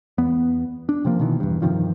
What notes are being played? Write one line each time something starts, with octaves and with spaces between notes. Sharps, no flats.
E2 B3
D4
C3 F3 A#3
B2 D#3 E3
E2 G2
G2 C3 D#3 F3